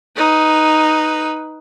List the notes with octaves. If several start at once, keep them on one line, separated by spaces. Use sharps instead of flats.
D#4 B4